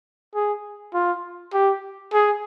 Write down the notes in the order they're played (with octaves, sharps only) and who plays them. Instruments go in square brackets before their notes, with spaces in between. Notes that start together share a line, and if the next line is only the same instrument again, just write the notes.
[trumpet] G#4
F4
G4
G#4